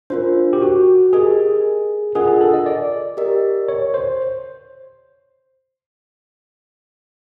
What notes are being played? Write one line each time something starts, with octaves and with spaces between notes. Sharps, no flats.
D4 F4 A#4 C5
G4
F#4
G4 G#4 A#4 D#5 G#5
D4 F4 G#4 A#4 D#5 F#5
G#4
A4
D#5
D5
G4 A#4 D#5
C#5
C5